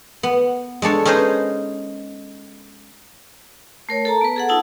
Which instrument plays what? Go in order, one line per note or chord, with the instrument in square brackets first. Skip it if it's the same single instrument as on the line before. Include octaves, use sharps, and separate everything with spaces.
[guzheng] B3
G#3 D4 A4 C#5
C#4 D#4 G#4 B4 C5 D#5
[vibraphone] A3 A#4 C#5
A4 A5 A#5
B3 B4
G#4 A4 F#5
D#4 F4 A5 E6